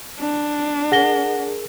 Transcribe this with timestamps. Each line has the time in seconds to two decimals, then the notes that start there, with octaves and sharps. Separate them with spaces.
0.19 D4
0.92 G#4 A#4 F#5 A#6 G7